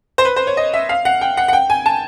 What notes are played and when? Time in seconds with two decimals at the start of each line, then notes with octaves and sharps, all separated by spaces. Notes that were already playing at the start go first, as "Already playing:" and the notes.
0.18 C5
0.25 B4
0.36 C5
0.47 C#5
0.57 D#5
0.74 E5
0.89 F5
1.05 F#5
1.21 G5
1.37 F#5
1.48 F#5
1.53 G5
1.70 G#5
1.86 A5